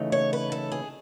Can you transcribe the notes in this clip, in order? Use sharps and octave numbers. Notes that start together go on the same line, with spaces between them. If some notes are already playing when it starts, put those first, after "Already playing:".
Already playing: C#3 E3 A3 D#4
C#5
B4
A4
G#4